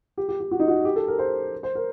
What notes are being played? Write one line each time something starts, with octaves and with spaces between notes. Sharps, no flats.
G4
G4
G4
F#4
D#4
F#4
G4
A4
A#4
C5
C5
A#4